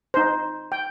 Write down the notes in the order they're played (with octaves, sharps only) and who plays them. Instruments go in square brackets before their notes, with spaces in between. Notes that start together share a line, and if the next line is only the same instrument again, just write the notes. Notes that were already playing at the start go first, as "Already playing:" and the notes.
[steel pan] D#4 C5
G5